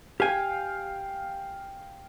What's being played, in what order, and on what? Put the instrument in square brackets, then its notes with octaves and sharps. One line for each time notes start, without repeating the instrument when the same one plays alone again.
[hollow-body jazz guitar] G4 G#5 [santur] F5 G5